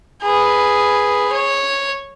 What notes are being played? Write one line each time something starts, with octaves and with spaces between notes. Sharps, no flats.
G#4 B4
C#5